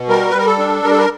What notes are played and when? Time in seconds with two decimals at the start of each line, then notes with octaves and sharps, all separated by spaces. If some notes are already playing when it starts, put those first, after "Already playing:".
Already playing: B2
0.08 G3 A#4
0.30 B4
0.33 G3 A#4
0.46 A4
0.59 D4
0.84 G3 A#4
0.91 A4
0.98 A#4